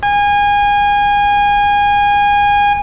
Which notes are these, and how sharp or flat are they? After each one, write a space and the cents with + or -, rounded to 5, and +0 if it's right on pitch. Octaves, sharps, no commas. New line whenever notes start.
G#5 -25